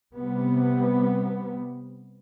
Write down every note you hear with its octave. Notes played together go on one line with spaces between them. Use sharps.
C3 G3 B3